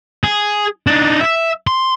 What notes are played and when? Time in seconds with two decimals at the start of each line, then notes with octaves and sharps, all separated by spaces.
0.24 G#4
0.87 D4 D#4
1.20 E5
1.67 C6